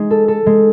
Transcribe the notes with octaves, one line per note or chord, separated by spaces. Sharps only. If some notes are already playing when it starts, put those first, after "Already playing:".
Already playing: G#3 D#4
A4
A4
G#3